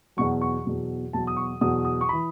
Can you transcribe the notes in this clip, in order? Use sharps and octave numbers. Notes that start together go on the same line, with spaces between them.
E2 B2 F#3 C#6
C#6
E2 B2 F#3
E2 B2 F#3 A5
D#6
C#6
E2 B2 F#3 D#6
D#6
C#6
E3 B5